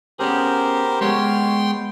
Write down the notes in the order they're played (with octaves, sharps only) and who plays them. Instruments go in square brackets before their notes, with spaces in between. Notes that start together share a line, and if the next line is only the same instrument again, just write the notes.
[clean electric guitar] B3 C#4 G#4 [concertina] G4 A#4 C5
[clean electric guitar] G#3 B3 C#5 [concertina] G5 C6